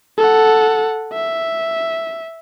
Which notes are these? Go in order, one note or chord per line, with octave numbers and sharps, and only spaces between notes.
A4 F#5
E5